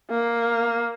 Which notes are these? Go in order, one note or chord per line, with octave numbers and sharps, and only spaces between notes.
A#3